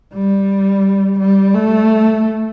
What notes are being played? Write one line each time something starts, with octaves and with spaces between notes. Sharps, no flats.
G3
G3
A3